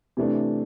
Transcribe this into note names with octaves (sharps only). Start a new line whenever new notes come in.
C3 E3 A3 D4